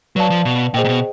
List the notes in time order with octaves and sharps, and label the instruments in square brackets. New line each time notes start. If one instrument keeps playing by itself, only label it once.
[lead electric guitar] F#3 [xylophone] B4 D5 F5 A5
[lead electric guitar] F3
B2
[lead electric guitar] A#2 [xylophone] G#4 C5 D#5 G5
[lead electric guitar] A#2
B2